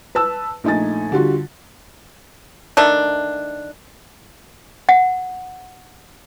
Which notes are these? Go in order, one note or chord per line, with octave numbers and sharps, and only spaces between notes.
B4 A5 E6
A#1 A3 D#4 G#5 A6
D3 G3 F4 F#4
D#3 A3 D4
F#5